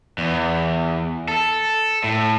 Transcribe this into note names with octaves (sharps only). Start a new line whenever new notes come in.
E2
A4
A2